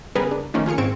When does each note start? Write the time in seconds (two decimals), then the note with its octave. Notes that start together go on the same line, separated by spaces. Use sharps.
0.15 C#3 G3 B3 G#4 A#4 B4
0.31 D4
0.54 D#3 F3 A3 A#3 C#4
0.66 C#4 F4 G#4 F6 C#7
0.78 G#2 C4 C#6 G#6 D7 E7